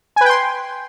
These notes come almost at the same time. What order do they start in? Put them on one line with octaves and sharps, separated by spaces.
G#5 B4 G5 C6